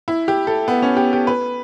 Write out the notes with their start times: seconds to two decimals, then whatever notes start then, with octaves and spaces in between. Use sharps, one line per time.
0.08 E4
0.28 G4
0.47 A4
0.68 B3
0.82 C#4
0.97 G4
1.13 G4
1.27 B4